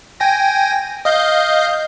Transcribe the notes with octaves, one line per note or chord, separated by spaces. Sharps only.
G5 G#5 A#6
D#5 F5 G6